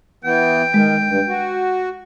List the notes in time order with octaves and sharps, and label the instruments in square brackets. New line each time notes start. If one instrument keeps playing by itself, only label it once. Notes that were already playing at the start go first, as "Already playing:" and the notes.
[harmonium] E3 B3 [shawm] G5
[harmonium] D#3 [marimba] G#3
[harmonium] G2
F#4